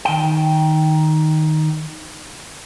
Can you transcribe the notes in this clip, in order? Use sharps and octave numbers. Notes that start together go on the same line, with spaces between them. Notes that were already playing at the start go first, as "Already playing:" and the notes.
D#3 G5